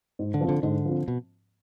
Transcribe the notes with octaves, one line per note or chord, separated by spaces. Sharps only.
G#2
D3
F3 C4
D3
G#2 D3
F3 C4
B2